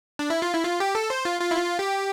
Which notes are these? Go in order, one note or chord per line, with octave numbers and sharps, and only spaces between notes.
D4
E4
F4
E4
F4
G4
A4
C5
F4
F4
E4
F4
G4